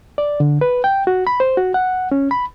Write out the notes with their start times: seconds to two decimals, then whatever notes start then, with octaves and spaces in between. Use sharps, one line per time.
0.18 D5
0.40 D3
0.61 B4
0.84 G5
1.07 F#4
1.27 B5
1.40 C5
1.57 F#4
1.74 F#5
2.12 C#4
2.31 B5